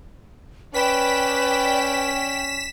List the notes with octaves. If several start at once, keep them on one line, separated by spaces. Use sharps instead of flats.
C#4 B4 D5 G5 B6 E7